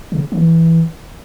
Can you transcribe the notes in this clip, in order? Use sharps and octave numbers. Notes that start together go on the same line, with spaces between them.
C#3
E3